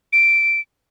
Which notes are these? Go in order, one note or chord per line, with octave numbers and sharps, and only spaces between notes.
D7